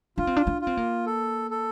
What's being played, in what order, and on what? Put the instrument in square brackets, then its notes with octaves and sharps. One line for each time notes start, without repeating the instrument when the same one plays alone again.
[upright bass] D4 [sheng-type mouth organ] F4
[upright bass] C4
D4
D4
[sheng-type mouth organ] F4
[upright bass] C4
A#3
[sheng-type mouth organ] A4
A4